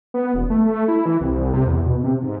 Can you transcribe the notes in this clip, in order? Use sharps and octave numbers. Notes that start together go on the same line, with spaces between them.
B3
E1
A3
E4
E3
C2
C3
E2
B2
C3
G#2